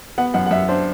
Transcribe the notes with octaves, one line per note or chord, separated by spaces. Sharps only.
B3 F#5
F#2 F#5
F#5
F#2 E5
D4 C5